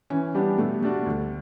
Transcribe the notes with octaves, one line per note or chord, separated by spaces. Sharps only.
E3 C#4
G3 B3 D4 G4
B2 A3
G3 A3 D4 F#4
D2